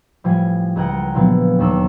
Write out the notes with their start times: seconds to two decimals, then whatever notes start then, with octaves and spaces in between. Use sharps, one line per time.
0.24 A2 F3 G3 G#5
0.76 C#2 G#4 A#4 F#5 G5
1.15 A#2 D3 F3 F#3 B3
1.58 E1 D#2 A4 C#6 E6